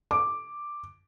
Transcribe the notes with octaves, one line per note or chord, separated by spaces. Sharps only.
D6